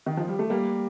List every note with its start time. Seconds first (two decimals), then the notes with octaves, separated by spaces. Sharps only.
0.06 D#3
0.17 F3
0.28 G3
0.39 A3
0.50 G3 A#3